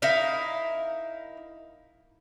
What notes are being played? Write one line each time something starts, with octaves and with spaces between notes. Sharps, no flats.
D#4 E4 A#4 F5